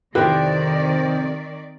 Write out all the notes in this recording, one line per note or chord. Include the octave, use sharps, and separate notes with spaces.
F2 C3 D#3 C4 E4 G4 B4 D5